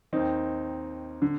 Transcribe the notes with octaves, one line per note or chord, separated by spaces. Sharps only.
D#2 D#3 C4 D#4
D3